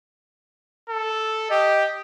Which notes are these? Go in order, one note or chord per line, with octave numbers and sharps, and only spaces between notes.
A4
G4 D#5